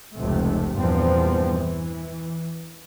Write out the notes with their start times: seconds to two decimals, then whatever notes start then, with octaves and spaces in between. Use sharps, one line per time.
0.17 F1 C#2 G#2 C3 A3
0.75 E2 G2 A#2 F3 B3 C4
1.56 E3